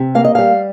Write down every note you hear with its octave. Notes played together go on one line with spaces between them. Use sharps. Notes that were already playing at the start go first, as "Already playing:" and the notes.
Already playing: C3
A#3 F5
D#5
G3 F5